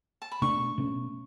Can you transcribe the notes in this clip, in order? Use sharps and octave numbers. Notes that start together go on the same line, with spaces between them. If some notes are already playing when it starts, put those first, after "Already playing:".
A5
B5
B2 A3 D4 C#6
B2 A3 C#4